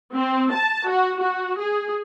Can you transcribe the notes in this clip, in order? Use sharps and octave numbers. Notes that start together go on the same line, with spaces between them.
C4
A5
F#4
F#4
G#4